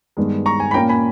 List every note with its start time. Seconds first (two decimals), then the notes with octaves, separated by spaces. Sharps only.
0.17 G2 D#3 G#3 B3
0.46 A#5 C#6
0.60 G#5
0.71 B5
0.74 A#2 A#3 C#4 G5 A#5
0.89 G#5 B5